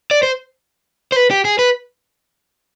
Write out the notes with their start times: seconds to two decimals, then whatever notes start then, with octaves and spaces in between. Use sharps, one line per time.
0.11 D5
0.23 C5
1.12 C5
1.16 B4
1.31 G4
1.45 G#4
1.59 B4